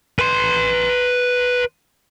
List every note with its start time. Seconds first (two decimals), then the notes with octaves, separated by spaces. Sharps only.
0.19 B4 C6